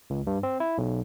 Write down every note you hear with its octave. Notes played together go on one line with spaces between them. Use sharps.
C#2
G2
C4
E4
B1